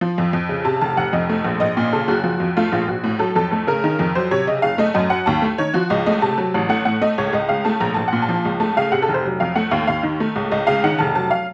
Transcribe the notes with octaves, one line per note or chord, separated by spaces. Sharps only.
F3
F2
F2
C#3
C3 A5
F1 A5
F1 F#5
F2 D#5
A3
A#1
A#1 D#5
A#2
C#3 A4
F#1 F#4
F3
F2
A3 F4
A#1 F4
A#1 F#4
A2
F#3 A4
F2 A4
A3 A4
C#3 A#4
D#3
F2
F#3 C5
C3 C#5
C#3 D#5
F#1 F5
A3 D#5
F#2 D#5
F#3 F#5
D#2 A5
A3
D#3 C#5
F3 F#4
C#2 D#5
A3 D#5
C3 A5
F#3
A1
A3 F#5
A2 F#5
A3 D#5
C#2 C#5
C#2 D#5
C#3 F5
A3 A5
A#1 A#5
A#1 A5
A#2 F#5
A5
F3
C#2
A3 A5
C#3 F5
C3 F#5
A4
F1
C5
F#3
F2 F5
A3 F#5
D#2 F5
D#2 F5
D#3
A3
C#2
C#2 D#5
C#3 F5
D#3 F#5
F1 A5
F#3 A5
F5